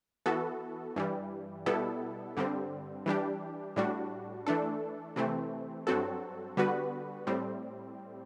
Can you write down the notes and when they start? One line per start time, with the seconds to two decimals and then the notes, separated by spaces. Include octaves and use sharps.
0.26 E3 B3 F#4 A4
0.96 G2 E3 G3
1.66 B2 G3 B3 E4 A4
2.37 G2 D3 G3 C4
3.06 E3 G3 D4 G4
3.76 A2 G3 D4 F#4
4.47 E3 A3 D4 A4
5.16 C3 E3 A3 C4
5.87 G2 F#3 C4 F#4 A4
6.57 D3 G3 B3 F#4 B4
7.27 A2 G3 C4